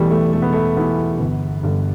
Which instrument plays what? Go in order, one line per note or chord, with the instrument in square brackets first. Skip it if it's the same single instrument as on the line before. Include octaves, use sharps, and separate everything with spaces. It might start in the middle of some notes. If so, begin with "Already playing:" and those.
Already playing: [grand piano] E1 E2 E3 G3 A3
A3
E1 A3
B3
A3
E2 E3 B3
G1
G2 D3